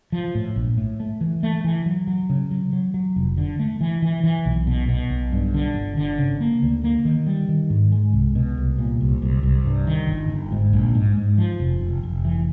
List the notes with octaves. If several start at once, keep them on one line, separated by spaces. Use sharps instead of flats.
F3
A2
A#1
A2
A3
E3
A3
E3
F#3
F#3
C#3
F#3
F#3
F#3
F1
D3
A3
E3
E3
E3
B1
B2
B2
B1
G2
D3
G1
D3
C#3
A#3
D2
A#3
D#3
G3
D#3
G#2
G#3
C2
B2
C2
A#2
C2
C2
C2
G2
D#3
G1
G1
G#2
A#1
G#2
G#2
F3
F1
F1
F1
E3